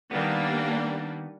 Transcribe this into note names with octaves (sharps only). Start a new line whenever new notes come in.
D#3 G3 A#3 B3 D4